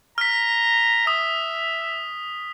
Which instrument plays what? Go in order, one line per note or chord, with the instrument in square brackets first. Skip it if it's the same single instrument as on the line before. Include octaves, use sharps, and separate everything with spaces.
[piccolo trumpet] A#5 [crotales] F6 B6
[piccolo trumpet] E5 [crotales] D#6